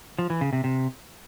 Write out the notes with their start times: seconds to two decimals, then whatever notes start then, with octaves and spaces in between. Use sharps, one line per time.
0.19 F3
0.30 E3
0.41 C#3
0.53 C3
0.64 C3